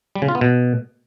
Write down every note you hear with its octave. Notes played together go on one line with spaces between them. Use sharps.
G3
C#3
F4
B3
B2